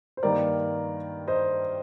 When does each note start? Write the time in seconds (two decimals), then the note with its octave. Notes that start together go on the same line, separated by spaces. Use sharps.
0.17 C5
0.23 G2 D#3 A#3 A#4 D5
1.28 C5 D#5